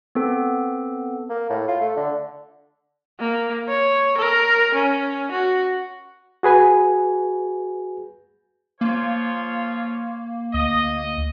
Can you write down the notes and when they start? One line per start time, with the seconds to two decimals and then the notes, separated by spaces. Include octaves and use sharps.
0.15 B3 C4 A4
1.30 A#3
1.50 A2
1.68 F4
1.81 A3
1.96 D3
3.20 A#3
3.69 C#5
4.18 A#4
4.75 C#4
5.32 F#4
6.43 F#4 G#4 B4 G#5
8.81 F3 A#3 F4 C#5
10.54 D2 D#5